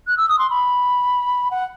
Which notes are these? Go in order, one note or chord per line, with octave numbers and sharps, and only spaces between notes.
F#6
E6
D#6
C6
B5
F#5